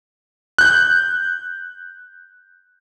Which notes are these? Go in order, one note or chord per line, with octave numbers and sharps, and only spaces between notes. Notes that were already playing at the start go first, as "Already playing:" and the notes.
F#6 G6